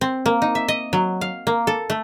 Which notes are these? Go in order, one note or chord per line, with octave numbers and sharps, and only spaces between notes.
C4
A#3
D#4
E5
D#5
F#3
F5
A#3
A4
A3